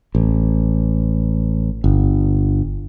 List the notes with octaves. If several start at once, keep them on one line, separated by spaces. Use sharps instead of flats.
A1
G1